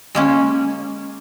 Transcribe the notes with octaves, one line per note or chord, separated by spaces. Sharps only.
G#3 A#3 C#4